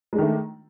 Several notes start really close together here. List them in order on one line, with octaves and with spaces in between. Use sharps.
G#3 D4 D#3 A3